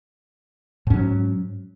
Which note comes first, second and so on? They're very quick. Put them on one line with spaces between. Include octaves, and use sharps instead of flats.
G#2 C#4 F#3